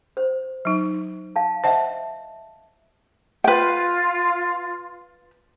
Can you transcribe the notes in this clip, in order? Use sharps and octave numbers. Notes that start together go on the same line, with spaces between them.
C5
F#3 D#4
F5 A5
C5 D#5 E5 F#5 A5
F4 B4 G5